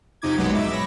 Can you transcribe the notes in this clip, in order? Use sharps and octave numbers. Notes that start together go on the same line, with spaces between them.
F2 C3 D#4 D6 G#6
A#1 B2 F#3 G#3 B4
G#2 E5 D6
C#5 B5 A#6